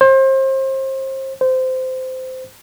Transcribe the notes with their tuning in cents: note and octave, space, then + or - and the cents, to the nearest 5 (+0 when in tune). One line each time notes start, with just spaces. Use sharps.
C5 +30
C5 -20